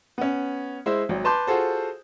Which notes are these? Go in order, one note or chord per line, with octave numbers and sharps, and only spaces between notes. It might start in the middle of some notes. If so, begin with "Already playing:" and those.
B3 C#4
G#3 E4 C5 E5
G#1 F#3
B4 A5 C6 D6 G6
F4 F#4 G#4 A4 C5